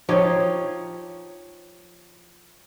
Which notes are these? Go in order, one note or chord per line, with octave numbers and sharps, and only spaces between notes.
F3 D#4 G4 C#5